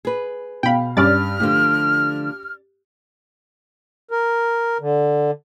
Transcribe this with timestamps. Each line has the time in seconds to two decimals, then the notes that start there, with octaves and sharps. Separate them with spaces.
0.05 G#4 B4
0.63 B2 F5 G5 B5
0.97 G2 C#4 D5 F6 A6
1.40 D3 F3 A3 G4
4.11 A#4
4.81 D3